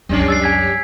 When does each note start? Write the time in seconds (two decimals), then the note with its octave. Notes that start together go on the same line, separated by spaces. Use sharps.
0.09 C#2 F#2 G3 C#4 D4
0.28 E6 A6 C7
0.43 G#5 G#6 B6